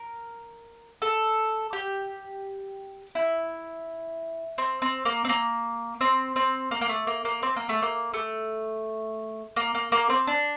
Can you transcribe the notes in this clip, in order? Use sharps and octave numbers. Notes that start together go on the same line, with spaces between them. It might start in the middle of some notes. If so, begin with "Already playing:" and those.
Already playing: A#4
A4
G4
E4
C4
C4
A#3
C4
A#3
C4
C4
A#3
A#3
A3
A#3
A#3
C4
A#3
A3
A#3
A3
A#3
A#3
A#3
C4
D4